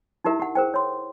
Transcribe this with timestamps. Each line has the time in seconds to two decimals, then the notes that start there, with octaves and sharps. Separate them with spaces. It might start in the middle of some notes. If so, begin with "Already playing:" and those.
0.24 D#4 E4 G4 A#4 E5
0.39 G4 F#5
0.55 G#4 A#4 C5 G5
0.74 C#5 C6